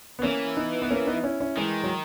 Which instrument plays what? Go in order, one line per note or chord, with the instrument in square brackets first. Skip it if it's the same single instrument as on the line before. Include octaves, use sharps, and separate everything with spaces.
[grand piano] B3
[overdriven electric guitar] E3 [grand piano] A#3 C#4
[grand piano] B3 D#4
B3
A#3 C#4
B3 D#4
C#4 E4
C#4 E4
[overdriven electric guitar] D#3 [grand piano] E3 G#3
[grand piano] F#3